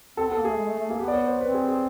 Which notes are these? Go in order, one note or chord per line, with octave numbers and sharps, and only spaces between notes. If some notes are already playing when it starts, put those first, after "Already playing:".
C4 A4
B3 A4
A#3
A3 G#4
G#3
A3
A3
A#3 G#4
B3 G4
D5
C#5
C5
C4 B4
G#4
G#4